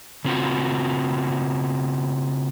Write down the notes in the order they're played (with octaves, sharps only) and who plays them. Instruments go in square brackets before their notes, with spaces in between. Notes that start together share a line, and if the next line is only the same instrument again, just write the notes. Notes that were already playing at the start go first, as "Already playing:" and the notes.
[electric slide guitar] C#3 C4 F4 F#4